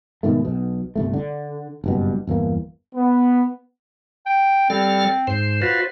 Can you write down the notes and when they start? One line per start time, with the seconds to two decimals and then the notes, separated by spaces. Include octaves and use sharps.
0.23 G#2 B2 D#3 A3
0.45 B1 B2
0.96 G1 C2 A3
1.13 D3
1.84 F#1 G2 B2
2.27 G1 E2 E3 A#3
2.95 B3
4.26 G5
4.70 G3 C4 A4 F6
5.27 G#2 C5
5.62 F4 F#4 B4 C5